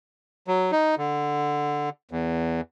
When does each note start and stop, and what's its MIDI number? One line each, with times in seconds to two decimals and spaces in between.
0.48 0.71 54
0.72 0.95 63
0.98 1.89 50
2.11 2.61 40